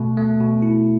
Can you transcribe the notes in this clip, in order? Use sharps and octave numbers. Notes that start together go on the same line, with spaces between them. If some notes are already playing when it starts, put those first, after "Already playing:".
Already playing: B2 A3
A3
B2
E4